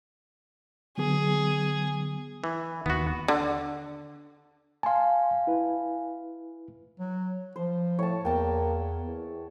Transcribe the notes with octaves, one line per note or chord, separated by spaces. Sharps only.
D3 F#3 B3 G#4
E3
D#2 D#3 B3 F#4
D3
F5 G#5 A5 C6
E4 B4
F#3
F3 C5
A2 C#5 A5
E2 A#3 G5 A5
E2